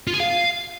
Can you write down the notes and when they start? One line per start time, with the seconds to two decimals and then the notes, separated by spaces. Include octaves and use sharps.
0.07 F4
0.14 G#4
0.20 F5